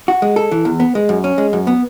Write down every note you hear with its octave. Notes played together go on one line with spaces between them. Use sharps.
F#4
G#3
A4
E3
E2
B3
G#3
F#2
C#4
G#3
F#2
B3